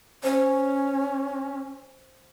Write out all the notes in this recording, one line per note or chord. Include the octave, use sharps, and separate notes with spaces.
C#4 C5